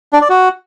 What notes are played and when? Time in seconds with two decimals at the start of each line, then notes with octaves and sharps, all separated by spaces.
0.13 D4
0.21 D5
0.30 F#4